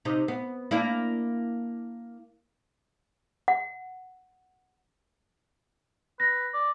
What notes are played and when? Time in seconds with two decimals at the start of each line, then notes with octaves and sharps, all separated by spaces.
0.05 C3 D#4
0.28 B3
0.71 A#3 D4 E4
3.48 F#5
6.20 B4 A#6
6.54 D5